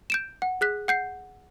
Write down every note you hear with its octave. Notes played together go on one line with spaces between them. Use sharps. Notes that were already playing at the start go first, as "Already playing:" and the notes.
G6 D7 E7
F#5
G#4 F#6 B6
F#5 G6 C7